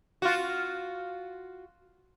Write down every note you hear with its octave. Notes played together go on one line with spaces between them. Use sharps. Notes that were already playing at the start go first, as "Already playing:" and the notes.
F4 F#4